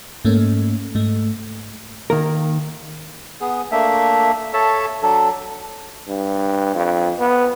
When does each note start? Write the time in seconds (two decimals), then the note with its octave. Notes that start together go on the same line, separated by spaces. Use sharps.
0.25 G#2 A3 A#3 C#4
0.95 G#2 A3
2.10 D#3 A#3 A#4
3.41 B3 G#4
3.72 A3 A#3 D4 E5
4.53 A4 C#5 E5 A5
5.02 F#3 D4 A4
6.08 G2
6.75 F2
7.19 B3